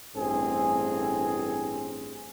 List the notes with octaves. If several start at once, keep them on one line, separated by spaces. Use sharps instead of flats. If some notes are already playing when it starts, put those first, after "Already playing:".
A1 G2 C4 G#4